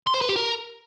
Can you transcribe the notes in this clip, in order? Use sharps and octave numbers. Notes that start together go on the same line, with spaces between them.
C6
C5
B4
G4
A#4